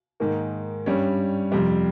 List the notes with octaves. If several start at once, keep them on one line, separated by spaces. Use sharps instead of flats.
G#2 D#3 A#3
G2 G3 C#4
F2 C3 G3